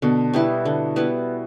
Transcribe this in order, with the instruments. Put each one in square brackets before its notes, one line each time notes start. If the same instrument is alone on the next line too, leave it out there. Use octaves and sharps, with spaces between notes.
[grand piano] B2 [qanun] D3
[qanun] G3 B3 E4
D3
G3 B3 E4